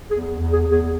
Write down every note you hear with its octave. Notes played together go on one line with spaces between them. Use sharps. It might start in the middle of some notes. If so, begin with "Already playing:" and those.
E2 G#4
E2
G#4
E2
G#4